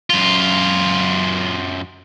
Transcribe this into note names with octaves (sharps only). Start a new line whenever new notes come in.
F#2 F4